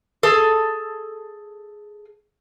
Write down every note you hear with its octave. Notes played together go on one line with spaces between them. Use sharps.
G#4 A4